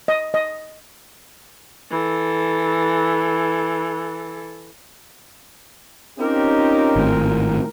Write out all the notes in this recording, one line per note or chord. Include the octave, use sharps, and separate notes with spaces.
D#5
D#5
E3 A4
C4 C#4 D#4 F4 G4 A#4
G#1 A2